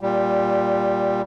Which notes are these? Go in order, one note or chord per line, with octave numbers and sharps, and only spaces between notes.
A#2 G3